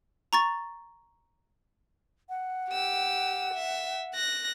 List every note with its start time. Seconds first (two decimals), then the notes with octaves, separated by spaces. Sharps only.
0.33 A#5 C#6 A6
2.29 F#5
2.71 G4 E6
3.54 E5
4.15 F#6 A#6